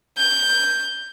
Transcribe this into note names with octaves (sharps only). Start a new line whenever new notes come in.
G6